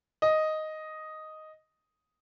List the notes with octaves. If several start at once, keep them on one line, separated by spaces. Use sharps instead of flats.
D#5